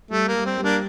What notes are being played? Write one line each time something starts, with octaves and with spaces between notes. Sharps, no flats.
G3 A3
A#3
G3
C4
G3
A#3 D4